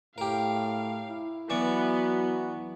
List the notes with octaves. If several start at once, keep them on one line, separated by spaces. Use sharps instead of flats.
A2 G4 A#4 F5
E4
E3 F#3 B3 F#4 D5 C#6